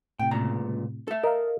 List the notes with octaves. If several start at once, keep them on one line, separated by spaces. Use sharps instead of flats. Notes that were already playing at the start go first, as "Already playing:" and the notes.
A2 C3 G5
C#2 A#2 A#5
A4 E5
A#4 D#5 F5